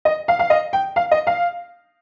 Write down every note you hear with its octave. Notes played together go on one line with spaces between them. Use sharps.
D#5
F5
F5
D#5
G5
F5
D#5
F5